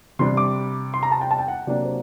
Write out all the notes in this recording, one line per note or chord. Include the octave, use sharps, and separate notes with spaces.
C3 G3 D4 C6
D6
C6
A#5
A5
G5
A5
G5
F#5
C3 F#3 A#3 D4 D5
C5